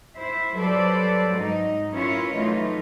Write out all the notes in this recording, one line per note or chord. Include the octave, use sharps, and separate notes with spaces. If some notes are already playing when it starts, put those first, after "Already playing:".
E4 C5 E5
F#3 G3 A4 B4 C5 D5
G#2 F#3 D#4
C#4 E4 F4 A#4 B4 C#5
E3 F#3 A3 D#4 F4